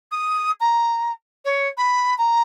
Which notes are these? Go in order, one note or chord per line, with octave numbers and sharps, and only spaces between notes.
D#6
A#5
C#5
B5
A#5